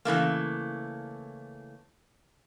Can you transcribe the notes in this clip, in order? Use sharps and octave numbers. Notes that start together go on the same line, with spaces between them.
C#3 E3 A3 A#3